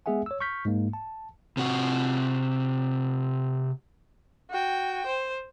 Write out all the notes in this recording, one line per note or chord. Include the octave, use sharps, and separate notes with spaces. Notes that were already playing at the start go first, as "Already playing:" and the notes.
G#3 B3 G#4 E5 F#5 G#5
C#5 E6
C#6 F6 G6 B6
G#2 G#3 A#3
A5
C3 F#4
F#4 G5
C5